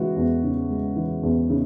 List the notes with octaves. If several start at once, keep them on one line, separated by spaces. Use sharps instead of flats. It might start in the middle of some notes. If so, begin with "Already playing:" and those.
Already playing: C#3 E3 G#3 F#4
E2
C#3
G#3
E3
E2
C#3